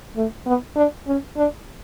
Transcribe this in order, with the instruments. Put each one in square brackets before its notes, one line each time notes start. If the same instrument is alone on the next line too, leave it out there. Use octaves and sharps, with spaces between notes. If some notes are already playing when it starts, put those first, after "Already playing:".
[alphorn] A3
B3
D4
C#4
D4